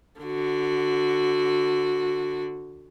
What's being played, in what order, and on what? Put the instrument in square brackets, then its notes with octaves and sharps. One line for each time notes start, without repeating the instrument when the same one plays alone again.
[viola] D3 F#4